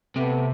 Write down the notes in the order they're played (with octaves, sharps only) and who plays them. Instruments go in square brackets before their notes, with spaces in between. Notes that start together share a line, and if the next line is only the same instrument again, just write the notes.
[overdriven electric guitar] C3 [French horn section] A3 B3